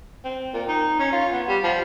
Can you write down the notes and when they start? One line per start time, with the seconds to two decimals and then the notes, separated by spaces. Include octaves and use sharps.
0.25 C4
0.54 A#2
0.68 D#4
0.99 C#4
1.13 F4
1.32 B3
1.48 G3
1.64 F3